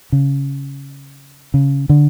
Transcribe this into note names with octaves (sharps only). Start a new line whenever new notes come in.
C#3
C#3
D3